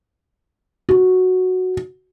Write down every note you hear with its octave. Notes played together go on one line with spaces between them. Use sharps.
F#4